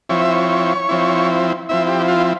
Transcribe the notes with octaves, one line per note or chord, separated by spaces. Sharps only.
F3 C4 E4 C#5
E5
C#5
F3 C4 E4
F3 C4 E4 E5
G4
F4